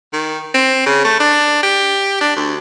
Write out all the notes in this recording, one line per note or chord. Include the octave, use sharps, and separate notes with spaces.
D#3
C4
C#3
A3
D4
G4
D4
D2